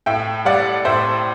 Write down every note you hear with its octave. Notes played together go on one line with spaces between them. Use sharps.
A2 E5 G5
G3 D5 F#5
A2 C5 E5